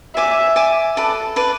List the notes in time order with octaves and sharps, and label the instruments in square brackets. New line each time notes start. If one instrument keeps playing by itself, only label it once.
[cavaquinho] D5 G#5 D6 [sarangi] E5
[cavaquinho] D5 G#5 D6
[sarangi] A4 [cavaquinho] B4 D5 A5
[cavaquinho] B4 D5 A5